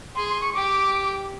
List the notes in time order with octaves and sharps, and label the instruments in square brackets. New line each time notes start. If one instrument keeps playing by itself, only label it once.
[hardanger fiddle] G#4 [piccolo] C6
[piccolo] C6
C#6
[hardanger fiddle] G4 [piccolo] D6